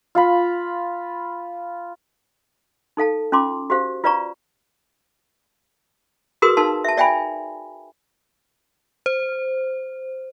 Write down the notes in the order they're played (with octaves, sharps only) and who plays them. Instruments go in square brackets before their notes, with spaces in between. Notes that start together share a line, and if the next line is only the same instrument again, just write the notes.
[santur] F4 F5 B5
[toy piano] D#4 A4 F5 A5
C#4 F4 A5 C6 D6
F#4 G4 C5 F5
F4 B4 D5 F5 A#5 C#6
F#4 G#4 A#4 B4 C6 D#6
D#4 A#4 F5 A5 C6
E5 A5
D5 E5 G5 G#5 B5
[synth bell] C5